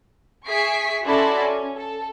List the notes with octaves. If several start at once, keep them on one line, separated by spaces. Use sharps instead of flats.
G#4 E5 C#6 B6 C7 D7
C#4 E4 F#4 A4 D5 C6
C#4
A4